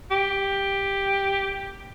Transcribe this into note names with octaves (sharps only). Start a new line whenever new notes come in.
G4